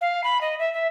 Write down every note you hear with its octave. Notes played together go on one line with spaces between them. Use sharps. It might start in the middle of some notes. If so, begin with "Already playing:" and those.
F5
B5
D#5
E5
E5